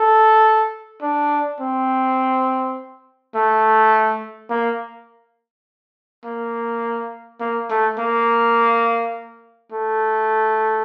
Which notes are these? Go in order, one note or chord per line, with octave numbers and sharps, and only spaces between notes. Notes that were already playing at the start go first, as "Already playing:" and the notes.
Already playing: A4
D4
C4
A3
A#3
A#3
A#3
A3
A#3
A3